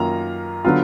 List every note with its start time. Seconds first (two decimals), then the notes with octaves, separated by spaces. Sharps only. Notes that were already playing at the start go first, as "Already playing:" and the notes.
Already playing: F#2 D#3 A#3 F4 A#5
0.65 D3 F#3 B3 F4